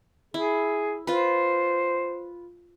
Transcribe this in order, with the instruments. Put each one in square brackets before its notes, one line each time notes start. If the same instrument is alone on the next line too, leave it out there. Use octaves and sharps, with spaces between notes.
[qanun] E4 [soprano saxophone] G#4
[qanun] F4 B4 [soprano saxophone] C5